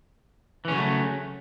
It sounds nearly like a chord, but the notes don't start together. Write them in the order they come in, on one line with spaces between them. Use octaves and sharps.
E3 C#4 C#3 F#3 A3